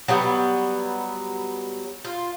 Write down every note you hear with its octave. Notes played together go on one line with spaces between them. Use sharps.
F#3 G3 B3
F4